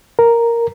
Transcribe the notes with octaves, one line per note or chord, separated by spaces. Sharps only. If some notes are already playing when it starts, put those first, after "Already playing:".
A#4